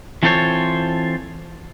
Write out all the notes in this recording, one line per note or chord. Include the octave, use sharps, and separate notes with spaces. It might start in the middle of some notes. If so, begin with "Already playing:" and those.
E3 C4 F4 A4 C5 C#5